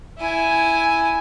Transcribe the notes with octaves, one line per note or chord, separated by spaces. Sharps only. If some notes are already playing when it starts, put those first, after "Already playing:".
E4 G#5